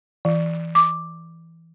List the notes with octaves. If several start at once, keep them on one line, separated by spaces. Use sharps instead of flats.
E3
D6